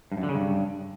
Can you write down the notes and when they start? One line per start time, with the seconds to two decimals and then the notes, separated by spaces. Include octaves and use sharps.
0.12 G2
0.17 F#2
0.23 D3
0.29 C#3
0.35 G2